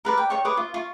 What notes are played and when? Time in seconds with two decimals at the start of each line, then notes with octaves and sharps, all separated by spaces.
0.05 A#4 B4 D5
0.17 G5
0.30 C#5 G5 C#6
0.45 B4 C#5 D6 D#6
0.57 F4
0.74 F4 C#6